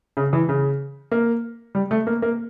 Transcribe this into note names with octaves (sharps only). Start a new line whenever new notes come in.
C#3
E3
C#3
A#3
G3
A3
A#3
A#3